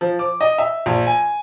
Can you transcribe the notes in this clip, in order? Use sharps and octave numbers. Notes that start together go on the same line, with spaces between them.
F3
D6
D#5
E5
A#1
G#5